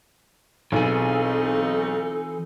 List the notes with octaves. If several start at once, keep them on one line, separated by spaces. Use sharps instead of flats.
B1 E3 C4 D#4 F4 G#4 A4